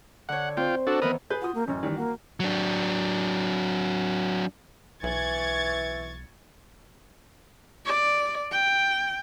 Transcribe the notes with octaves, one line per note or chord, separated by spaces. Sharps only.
D3 C#5 F#5
C4 F4 C5 G5
D4 F#4 A4
D#3 E3 B3 A#4 B4 D#6
G#4 B4 G6
F4 F#4 D#6
A#3
A1 F#2 C#4
D#3 E3 G3
A#3 F#4
F#3 D4
B1 E3 C#6 G#6 A6
D5
G5